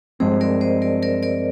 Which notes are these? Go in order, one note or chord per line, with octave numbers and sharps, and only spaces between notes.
G2 F3 G#3 C4 G#4 C5
A#4 D5
C5 D#5
A#4 D5
A#4 D5
A#4 D5